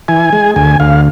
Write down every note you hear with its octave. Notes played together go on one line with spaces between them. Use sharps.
E3 G#5
G#3
D2 G#5
D2 F5